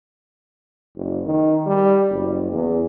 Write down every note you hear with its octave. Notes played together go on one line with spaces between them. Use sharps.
F#1
D#3
G3
F#1
E2